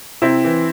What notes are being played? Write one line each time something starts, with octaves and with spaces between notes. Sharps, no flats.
C3 C4 E4
E3